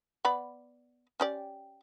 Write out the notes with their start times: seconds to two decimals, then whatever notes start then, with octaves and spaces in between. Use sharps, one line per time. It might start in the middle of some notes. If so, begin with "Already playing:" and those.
0.25 B3 D5 B5
1.20 C#4 G4 D5